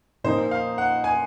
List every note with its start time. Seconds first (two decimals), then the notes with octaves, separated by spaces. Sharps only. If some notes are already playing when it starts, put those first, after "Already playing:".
0.24 A#2 F3 A#3 D#4 C5
0.51 F5
0.78 F#5
1.04 G#5